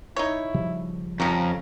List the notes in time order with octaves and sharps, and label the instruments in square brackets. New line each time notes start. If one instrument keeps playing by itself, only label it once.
[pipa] D#4 C#5 [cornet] E4
[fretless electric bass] C#3 F3 G3
[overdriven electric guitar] F2 [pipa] C3 C#4 [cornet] A#5